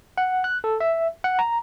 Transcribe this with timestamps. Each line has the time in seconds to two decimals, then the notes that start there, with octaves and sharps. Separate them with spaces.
0.18 F#5
0.44 F#6
0.64 A4
0.80 E5
1.24 F#5
1.39 A#5